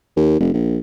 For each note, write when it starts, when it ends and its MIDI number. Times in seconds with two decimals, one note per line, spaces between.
0.16 0.38 39
0.40 0.50 29
0.54 0.78 34